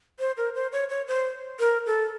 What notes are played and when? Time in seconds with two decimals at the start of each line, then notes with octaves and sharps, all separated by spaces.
0.19 C5
0.37 A#4
0.55 C5
0.72 C#5
0.89 C#5
1.08 C5
1.60 A#4
1.86 A4